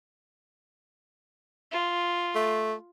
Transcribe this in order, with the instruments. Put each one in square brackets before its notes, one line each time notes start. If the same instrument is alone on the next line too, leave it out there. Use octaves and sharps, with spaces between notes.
[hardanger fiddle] F4
[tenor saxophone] A3